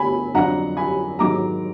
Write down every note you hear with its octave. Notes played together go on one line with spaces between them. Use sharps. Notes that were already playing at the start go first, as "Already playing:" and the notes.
Already playing: D2 D3 B3 G#5 B5
F2 D3 F#3 D4 F#5 A#5
G#5 B5
G#2 D#3 F#3 A#5 D6